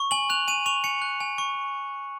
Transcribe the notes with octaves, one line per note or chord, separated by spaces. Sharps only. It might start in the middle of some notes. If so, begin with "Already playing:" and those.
Already playing: C#6
G#5 F#7
F#6 F7
G#5 D#7
C#6 F7
G#5 C#7
F#6
G#5
C#6